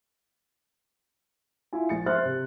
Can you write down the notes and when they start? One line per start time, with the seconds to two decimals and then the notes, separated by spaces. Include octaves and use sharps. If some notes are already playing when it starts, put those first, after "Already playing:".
1.73 E4 F4 G#5
1.89 A#1 A6 C#7
2.06 C5 E5 C6 F6 F#6 A6
2.25 C3